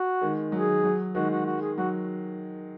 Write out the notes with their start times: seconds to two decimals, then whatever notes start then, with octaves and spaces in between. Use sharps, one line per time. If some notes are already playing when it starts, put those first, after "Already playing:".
Already playing: F#4
0.21 D#3 G#3
0.52 F#3 G#4
0.68 D#3
0.83 F#3
1.15 D#3 G#3 F#4
1.30 F#4
1.46 F#4
1.61 G#4
1.77 F#3 F#4